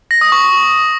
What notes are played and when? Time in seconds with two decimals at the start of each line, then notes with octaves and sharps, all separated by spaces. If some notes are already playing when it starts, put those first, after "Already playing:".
0.11 A#6
0.21 D#6
0.32 C#6